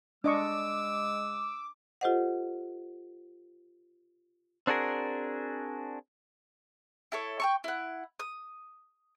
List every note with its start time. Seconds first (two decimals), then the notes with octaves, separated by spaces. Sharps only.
0.24 G#3 D4 D#5 C#6 D6 E6
2.01 F4 G4 A4 C5 D#5 F#5
4.67 C4 D4 F#4 G#4 A#4
7.12 E4 A4 C#5
7.40 G5 A5 C#6
7.64 E4 F#5
8.20 D#6